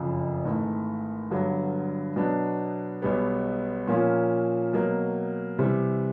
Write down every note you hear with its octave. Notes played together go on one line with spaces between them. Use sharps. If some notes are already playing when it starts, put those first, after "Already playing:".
Already playing: F#1 F2 C#3 F3
G#1 G#2 E3 A3
G1 G2 D3 F#3
B2 F#3 B3 D4
B1 B2 G3 B3
A#2 F3 A#3 C#4 F4
B2 F#3 A#3
C3 E3 G3 C4